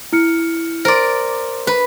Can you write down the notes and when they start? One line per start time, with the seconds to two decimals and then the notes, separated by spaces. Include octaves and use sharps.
0.13 E4 F6 C#7
0.85 A#4 C5 D5 C6
1.67 B4